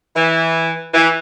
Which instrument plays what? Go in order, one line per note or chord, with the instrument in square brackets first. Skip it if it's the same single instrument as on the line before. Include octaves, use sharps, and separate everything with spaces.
[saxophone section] E3
E3